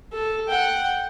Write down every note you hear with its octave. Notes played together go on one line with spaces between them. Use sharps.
A4
F#5 G5